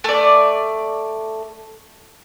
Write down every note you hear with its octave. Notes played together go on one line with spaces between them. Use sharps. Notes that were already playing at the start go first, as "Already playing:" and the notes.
A3 D5